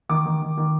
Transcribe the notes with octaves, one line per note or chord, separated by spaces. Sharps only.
D#3 D6
D#3
D#3
D#3